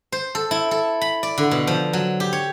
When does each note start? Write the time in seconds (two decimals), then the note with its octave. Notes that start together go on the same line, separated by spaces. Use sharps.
0.12 C5
0.35 A4
0.51 E4
0.71 A4
1.01 B5
1.23 D5
1.38 D3
1.51 B2
1.67 F3
1.93 F#3
2.20 G4
2.33 C#5